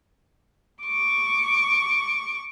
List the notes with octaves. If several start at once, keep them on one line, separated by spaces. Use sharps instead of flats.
C#6 D6